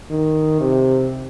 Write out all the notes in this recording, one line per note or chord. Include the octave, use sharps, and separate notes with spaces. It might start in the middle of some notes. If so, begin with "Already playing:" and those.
D#3
C3